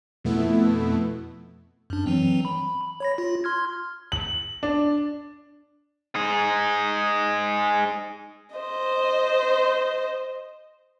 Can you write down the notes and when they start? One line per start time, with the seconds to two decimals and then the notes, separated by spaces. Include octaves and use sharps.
0.24 F2 B2 A3 B3 E4
1.90 F#2 D4
2.06 E3 F#3 C4
2.45 B5
3.00 C#5 B5 A#6
3.18 F4
3.44 C6 F6 G#6
4.12 F#7
4.63 D4
6.15 D#4 G#4
8.56 C5 D#5